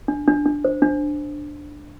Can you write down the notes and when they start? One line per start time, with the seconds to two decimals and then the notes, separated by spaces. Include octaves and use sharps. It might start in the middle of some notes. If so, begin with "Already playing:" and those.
0.08 D4
0.28 D4
0.46 D4
0.65 C5
0.82 D4